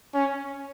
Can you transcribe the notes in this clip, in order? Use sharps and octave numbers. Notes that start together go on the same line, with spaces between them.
C#4